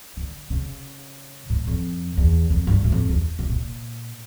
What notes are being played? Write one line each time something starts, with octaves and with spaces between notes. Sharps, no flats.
D3
C#3
A2
F2
E2
F2
G2
A2
F2
E2
A2
A#2